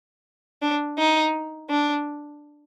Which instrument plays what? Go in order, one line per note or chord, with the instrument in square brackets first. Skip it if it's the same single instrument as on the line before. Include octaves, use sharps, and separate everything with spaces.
[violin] D4
D#4
D4